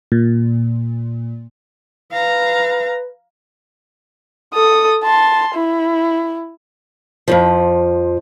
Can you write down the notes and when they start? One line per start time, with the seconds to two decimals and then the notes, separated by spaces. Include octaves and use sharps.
0.12 A#2
2.12 B4 F5 A#5
4.54 A4 D#6
5.04 A5 C6
5.55 E4
7.28 F2 G#2 F3